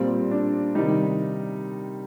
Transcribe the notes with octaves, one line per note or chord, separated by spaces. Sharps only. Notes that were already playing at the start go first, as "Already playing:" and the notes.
Already playing: A#2 G3 C4
D4
C3 D#3 G3 D#4